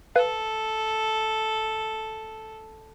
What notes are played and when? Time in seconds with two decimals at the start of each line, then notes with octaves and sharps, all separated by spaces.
0.16 A4 B4 F5